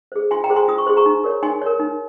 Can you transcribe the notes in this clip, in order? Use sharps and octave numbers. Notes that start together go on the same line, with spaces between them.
G#4 C5
F4 G#5 C6
G5 A#5
G#4 C5
G#5 C6
F4 D#6
C#6
G#4 C5 C6
A#5 C#6
D#4
A#4 C#5
D#4 G#5 C6
A#4 C#5
D#4